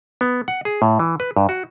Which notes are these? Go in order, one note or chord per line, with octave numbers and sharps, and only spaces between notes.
B3
F#5
G#4
A2
E3
B4
G2
F#4